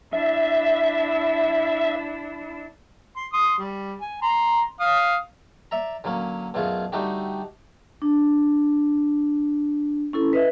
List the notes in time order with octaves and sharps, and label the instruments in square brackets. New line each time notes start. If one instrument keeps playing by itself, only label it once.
[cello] D4 E4 [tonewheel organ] E5
[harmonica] C6
C6 D#6
G3
G#5
A#5 C6
F5 D#6
[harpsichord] D5 E5 A#5
D3 F#3 A#3 C#4
F#2 B2 A3 F4 G#4
D3 G3 A3 D#4 F#4 G4
[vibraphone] D4
C#4 E4 A4
B4 D#5 E5